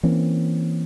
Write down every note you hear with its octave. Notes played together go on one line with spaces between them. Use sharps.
E3 A#3 C4 C#4